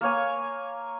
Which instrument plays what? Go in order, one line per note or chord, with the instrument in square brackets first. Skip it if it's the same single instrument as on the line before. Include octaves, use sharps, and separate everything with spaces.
[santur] A#3 C#5 G#5